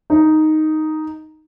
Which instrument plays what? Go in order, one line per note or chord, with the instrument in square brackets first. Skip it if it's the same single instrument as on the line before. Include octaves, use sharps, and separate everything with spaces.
[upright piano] D#4